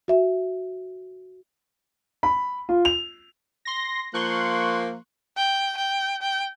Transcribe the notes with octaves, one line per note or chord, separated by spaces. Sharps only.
F#4 E5
B5
F4
F7
C6 A#6
F3 A#3 C6 C#6 F#6
G5
G5
G5